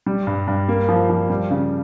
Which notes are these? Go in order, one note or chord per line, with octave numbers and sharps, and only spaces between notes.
G3
G2
G2
A#3
F3
F3
G3
C#3